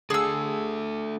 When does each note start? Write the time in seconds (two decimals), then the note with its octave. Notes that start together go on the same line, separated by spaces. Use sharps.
0.10 A3 D4 G#4 A4 E6